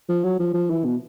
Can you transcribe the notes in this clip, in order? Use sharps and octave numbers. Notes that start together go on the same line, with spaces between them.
F3
F#3
F3
F3
E3
B2